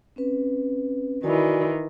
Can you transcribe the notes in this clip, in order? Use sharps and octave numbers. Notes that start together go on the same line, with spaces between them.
C4 C#4 B4
D#3 E3 F#4 D5 G#5